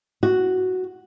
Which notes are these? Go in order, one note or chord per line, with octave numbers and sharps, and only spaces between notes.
F#4